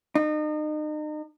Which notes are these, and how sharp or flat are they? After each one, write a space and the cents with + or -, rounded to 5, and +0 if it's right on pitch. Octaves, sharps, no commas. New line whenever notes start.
D#4 -35